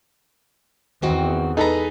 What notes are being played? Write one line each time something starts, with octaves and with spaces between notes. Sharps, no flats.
E2 D#3 C4 F#4
D#4 G#4 A4 B4 A#5